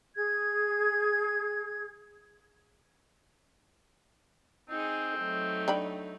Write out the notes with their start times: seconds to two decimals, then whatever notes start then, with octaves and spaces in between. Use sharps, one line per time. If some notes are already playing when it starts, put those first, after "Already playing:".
0.15 G#4 G#6
4.70 C4 D#4 G#4
5.18 F#3 A3 D#4
5.68 D4 G5 B5